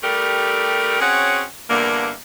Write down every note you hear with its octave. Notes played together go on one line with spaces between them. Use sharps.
G3 A3 D4 G4 A4 A#4
C4 C#4 F#4 G#4 C#5 F#5
E2 G2 D3 A#3